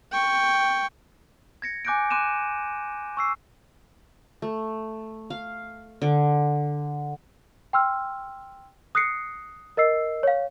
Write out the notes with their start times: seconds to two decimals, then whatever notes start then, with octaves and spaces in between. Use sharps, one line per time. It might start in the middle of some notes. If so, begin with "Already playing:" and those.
0.12 G5 C#6
1.62 G#6 A#6 C#7
1.85 G#5 D6 F#6 G6 A#6 D7
2.11 C6 D6 F#6 D#7 E7
3.17 C#6 E6 C7
4.42 A3
5.30 F5
6.02 D3
7.73 G5 C6 E6 F6
8.95 D#6 F#6 A#6 C7 C#7
9.77 A#4 D#5 E6 C7
10.23 C#5 F5